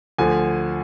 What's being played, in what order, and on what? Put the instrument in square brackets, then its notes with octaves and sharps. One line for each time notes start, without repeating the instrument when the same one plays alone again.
[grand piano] D2 D3 F3 G#5